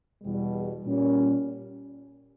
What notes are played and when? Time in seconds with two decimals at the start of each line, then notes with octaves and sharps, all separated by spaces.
0.22 E2 B2 G3
0.84 A#2 G3 C#4